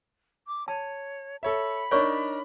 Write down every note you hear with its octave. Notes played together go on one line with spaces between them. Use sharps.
D6
C#5 A5
A4 C#5 E5 B5
D4 D#4 A#4 C#5 D5 C#6